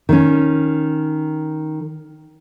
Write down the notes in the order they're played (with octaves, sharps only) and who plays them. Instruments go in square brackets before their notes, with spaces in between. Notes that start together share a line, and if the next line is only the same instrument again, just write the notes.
[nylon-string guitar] D#3 C#4